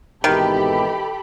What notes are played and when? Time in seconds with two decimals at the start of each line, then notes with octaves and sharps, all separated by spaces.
0.24 G#1 B2 D#3 E3 G4 A4 B5